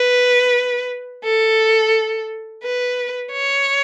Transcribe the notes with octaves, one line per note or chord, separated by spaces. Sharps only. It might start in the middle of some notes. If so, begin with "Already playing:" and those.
Already playing: B4
A4
B4
C#5